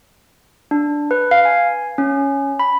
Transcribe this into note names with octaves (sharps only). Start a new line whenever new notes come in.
D4
B4
F5
G#5
C#4
B5